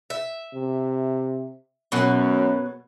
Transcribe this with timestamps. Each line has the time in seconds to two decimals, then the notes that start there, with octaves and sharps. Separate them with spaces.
0.10 E5
0.53 C3
1.92 F#2 B2 F#3